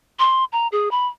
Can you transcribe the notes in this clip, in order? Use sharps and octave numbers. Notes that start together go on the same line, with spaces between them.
C6
A#5
G#4
B5